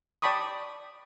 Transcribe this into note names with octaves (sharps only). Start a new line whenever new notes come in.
D5 G5 A5 B5 C#6 D#6